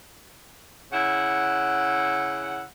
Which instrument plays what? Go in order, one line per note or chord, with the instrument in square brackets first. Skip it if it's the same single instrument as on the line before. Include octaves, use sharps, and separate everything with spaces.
[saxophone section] C#3 E4 F#5